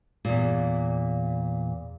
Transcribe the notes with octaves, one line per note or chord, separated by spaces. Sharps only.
E2 A#2